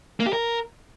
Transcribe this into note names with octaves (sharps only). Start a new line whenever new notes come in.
A#3
G4
A#4